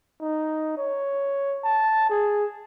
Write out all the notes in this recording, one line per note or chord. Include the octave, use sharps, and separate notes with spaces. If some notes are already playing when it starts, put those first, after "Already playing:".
D#4
C#5
A5
G#4